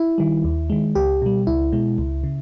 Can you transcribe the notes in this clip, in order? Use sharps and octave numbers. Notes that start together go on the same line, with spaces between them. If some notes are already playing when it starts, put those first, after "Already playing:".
Already playing: E4
D#3 G3
D#2
D#3 G#3
C#2 G4
B2 G3
C#2 E4
B2 G#3
C#2
C#3